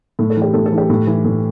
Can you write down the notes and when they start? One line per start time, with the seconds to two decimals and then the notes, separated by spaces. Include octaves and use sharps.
0.19 A2
0.30 A4
0.36 E3
0.42 G4
0.54 A2 A4
0.66 A4
0.72 E3
0.78 G4
0.90 A2
1.07 E3
1.24 A2